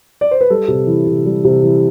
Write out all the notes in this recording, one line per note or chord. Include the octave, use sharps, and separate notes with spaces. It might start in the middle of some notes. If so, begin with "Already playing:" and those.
D5
C5
B4
G3 A4
C3
E3
C3
G3
C3
E3